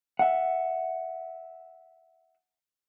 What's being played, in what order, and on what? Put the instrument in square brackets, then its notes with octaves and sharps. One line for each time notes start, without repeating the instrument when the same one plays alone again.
[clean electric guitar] E5 F#5